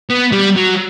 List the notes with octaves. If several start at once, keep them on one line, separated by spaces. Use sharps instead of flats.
B3
G3
F#3